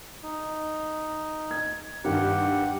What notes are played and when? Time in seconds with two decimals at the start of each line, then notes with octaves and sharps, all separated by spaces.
0.23 D#4
1.51 G#6
2.04 G2 D#3 G4 F#5